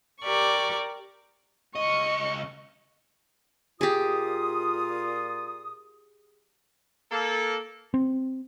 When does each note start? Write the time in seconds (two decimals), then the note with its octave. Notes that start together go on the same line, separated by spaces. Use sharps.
0.22 G4 A#4 D5 C#6
1.75 C#2 D#5 C#6 C#7
3.81 A#2 F4 G4 G#4 D#6
7.11 A#3 A4
7.94 C4